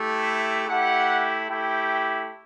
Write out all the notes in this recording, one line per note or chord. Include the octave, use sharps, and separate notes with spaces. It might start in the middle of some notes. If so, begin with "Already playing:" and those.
Already playing: A3 E4 G4
A3 E4 G4 F#5
A3 E4 G4 G5